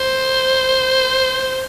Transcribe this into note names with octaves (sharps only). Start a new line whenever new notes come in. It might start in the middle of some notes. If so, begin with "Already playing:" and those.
Already playing: C5